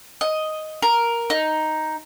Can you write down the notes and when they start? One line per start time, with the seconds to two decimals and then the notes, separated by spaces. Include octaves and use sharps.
0.21 D#5
0.82 A#4
1.30 D#4